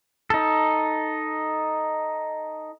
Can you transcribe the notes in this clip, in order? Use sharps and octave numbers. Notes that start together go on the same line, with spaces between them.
D#4 A4